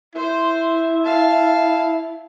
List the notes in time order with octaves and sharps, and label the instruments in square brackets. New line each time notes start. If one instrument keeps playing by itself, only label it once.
[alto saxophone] E4 [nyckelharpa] C5
[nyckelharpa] F5 A5